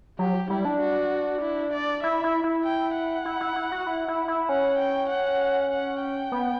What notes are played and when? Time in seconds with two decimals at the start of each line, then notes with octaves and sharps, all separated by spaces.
0.19 F#3 G4
0.50 G3 E4
0.65 D4
0.81 F#4
1.42 E4
1.73 D5
2.03 E4 E5
2.24 E4
2.44 E4
2.64 G5
2.95 F#5
3.25 E4
3.41 E4
3.56 E4
3.72 F#4
3.87 E4
4.08 E4
4.28 E4
4.49 C#4 F#5
4.79 G5
5.10 F#5
5.71 F#5
6.01 G5
6.32 B3